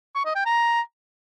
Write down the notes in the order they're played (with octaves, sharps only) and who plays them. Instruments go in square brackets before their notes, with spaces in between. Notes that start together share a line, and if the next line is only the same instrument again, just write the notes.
[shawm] C#6
D#5
G5
A#5